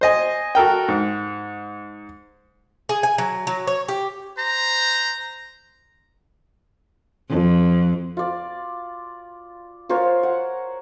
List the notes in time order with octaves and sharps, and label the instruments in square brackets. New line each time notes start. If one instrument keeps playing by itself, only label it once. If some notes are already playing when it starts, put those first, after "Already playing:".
[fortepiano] C5 D#5 G#5
F#4 A4 A#4 G5
G#2
[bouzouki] G#4
G#5
F#3
F#3
C#5
G4
[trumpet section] C5 A#5
[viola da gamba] F2
[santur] F4 D5
F4 A#4 C5 C#5
F#5